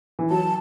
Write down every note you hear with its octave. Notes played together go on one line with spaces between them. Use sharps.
E3
F#3 A5